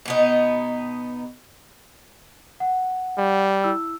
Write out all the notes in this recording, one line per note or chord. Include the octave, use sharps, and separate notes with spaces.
B2 B3 D#4
F#5
G3
E4 E6